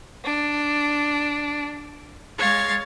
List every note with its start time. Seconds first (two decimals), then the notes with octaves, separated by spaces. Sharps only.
0.24 D4
2.39 G#3 C#5 F5 A6